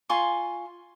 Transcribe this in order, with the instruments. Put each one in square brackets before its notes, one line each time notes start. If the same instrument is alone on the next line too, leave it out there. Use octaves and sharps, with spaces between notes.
[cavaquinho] F4 G#5 C6 C#6